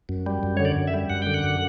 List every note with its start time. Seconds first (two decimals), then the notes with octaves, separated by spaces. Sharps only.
0.09 F#2
0.26 G3
0.43 F#2
0.57 D3 C#5
0.65 D5
0.76 F#2
0.87 E5
0.94 G3
1.10 F#2 F#5
1.22 D3 G5
1.34 F#5
1.43 F#2